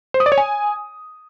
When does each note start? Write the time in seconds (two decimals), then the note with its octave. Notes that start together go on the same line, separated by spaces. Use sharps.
0.14 C5
0.20 D#6
0.26 D5
0.32 C#5
0.38 G#5